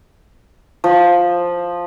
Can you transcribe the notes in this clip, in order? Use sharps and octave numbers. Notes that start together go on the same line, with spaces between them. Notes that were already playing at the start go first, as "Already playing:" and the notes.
F3